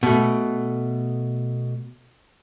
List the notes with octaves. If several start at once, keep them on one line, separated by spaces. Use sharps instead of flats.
B2 A3